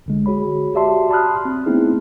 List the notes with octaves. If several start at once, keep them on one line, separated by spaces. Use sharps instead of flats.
B1 D3 G#3
F#4 G#4 C#5 B5
F#4 G4 D5 E5 A5 C6
A5 B5 C6 D#6 F6 F#6
C4
A3 B3 C4 D#4 E4 G#4